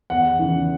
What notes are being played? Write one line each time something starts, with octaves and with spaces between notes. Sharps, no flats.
E2 F#5
C#3 E3